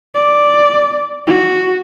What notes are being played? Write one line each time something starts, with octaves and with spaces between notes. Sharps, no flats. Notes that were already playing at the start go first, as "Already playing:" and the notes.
D5
F#4